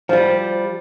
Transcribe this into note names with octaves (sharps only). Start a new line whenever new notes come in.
F3 G3